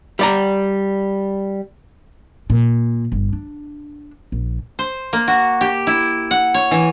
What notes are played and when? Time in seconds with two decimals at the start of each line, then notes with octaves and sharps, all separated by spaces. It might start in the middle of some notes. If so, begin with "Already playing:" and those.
0.19 G3 D5 A#5
2.50 A#2
3.12 G1
3.33 D4
4.32 A#1
4.79 C5
5.13 A#3
5.28 F#4
5.61 G4
5.87 E4
6.31 F#5
6.54 C#5
6.71 E3